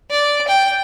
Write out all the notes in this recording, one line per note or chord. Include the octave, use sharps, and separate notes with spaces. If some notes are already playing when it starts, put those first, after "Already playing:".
D5
G5